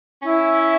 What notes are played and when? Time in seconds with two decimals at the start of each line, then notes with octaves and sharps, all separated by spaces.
0.22 C#4 E4
0.59 E5